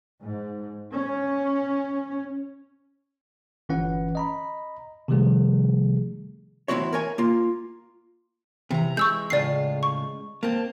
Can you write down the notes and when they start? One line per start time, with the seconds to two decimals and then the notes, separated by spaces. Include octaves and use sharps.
0.21 G#2
0.92 C#4
3.69 G1 E3 C#4 B4 F#5
4.15 D#5 A#5 B5
5.08 C3 D#3 F3 G3 A3 G#4
6.68 E2 A2 C4 E4 F#4 C#5
6.93 A#4 C#5 G#5
7.18 A#3 F4
8.71 C3 E3 A#5
8.97 G#3 C#6 E6 G6
9.30 A2 C#3 F4 D5 C7
9.83 C#6
10.43 A#3 C4 A5